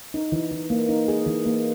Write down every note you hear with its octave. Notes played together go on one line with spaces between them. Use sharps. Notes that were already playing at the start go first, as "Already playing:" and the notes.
D#4
E3
E3
A#3
D#4
G#4
E3
A#3